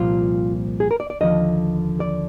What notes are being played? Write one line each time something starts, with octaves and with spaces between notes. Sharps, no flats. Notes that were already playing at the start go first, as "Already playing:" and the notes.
Already playing: C2 A#2 F3 F4
G#4
A#4
D5
D5
D#2 D3 F3 D#5
D5